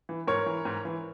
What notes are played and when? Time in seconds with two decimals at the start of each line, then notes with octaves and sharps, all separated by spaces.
0.09 E3
0.27 G#2 A#4 C#5
0.46 E3
0.65 G#2
0.85 E3